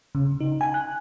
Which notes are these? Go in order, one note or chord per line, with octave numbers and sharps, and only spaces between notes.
C#3
D#4
G#5
F#6